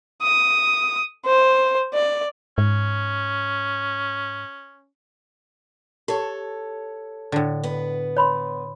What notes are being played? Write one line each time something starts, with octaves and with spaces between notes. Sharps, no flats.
D#6
C5
D5
G#2 C#4
G4 A4 C#5
A2 D3
B3 B4
C#5 B5 C6